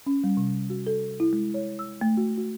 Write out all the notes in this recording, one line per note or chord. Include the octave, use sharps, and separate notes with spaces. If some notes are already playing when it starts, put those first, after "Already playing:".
C#4
G3
C3
F#4
A4
E4
G#3
C#5
E6
A3
F#4
F#4